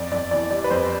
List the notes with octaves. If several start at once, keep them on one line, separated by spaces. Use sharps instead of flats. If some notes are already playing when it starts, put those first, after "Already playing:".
Already playing: F2 D5
F2 D5
E3 D5
G3 D5
B4
F2 C5